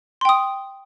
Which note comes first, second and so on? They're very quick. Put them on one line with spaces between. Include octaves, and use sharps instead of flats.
C6 G5 D#6